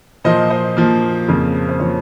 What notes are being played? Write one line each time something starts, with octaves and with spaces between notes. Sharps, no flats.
A#2 F3 A#3 C5 D#5
C5 D#5
A#2 F3 A#3
F2 C#3 F3 A#3
C5
C#3 F3 A#3 C#5